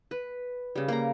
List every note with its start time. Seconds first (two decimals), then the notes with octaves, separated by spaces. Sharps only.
0.11 B4
0.75 C#3 G3
0.88 A#3 F5 A#5